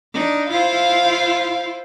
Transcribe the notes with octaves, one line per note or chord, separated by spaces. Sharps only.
D4 D#4
E4 F4 C5 F5